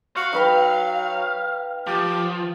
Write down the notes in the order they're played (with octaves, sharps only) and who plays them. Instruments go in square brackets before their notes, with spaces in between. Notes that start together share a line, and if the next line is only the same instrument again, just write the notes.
[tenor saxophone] F#4 [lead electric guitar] F5
[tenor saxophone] F#3 [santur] D#4 B4 G5
[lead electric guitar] F3 [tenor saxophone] G4